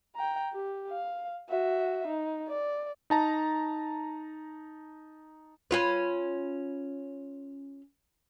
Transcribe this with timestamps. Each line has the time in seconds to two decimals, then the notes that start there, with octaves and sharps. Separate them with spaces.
0.16 G5 A#5
0.53 G4
0.90 F5
1.49 F#4 E5
2.07 D#4
2.48 D5
3.10 D#4 A5 A#5
5.71 C#4 F4 B4